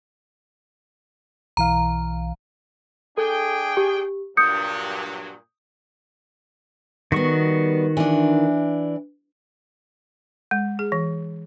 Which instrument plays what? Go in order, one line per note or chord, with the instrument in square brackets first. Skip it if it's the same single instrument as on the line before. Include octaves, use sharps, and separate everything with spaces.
[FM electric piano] B1 E3 F5 [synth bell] A#5
[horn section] D4 G#4 G5 [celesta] A4
[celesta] G4
[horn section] G2 A#2 F#3 [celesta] D#6 G6 C#7
[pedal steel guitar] D#3 F#4 C#6 [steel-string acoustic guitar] G3 B3
[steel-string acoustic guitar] E3 D4
[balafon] G#3
G#4
E3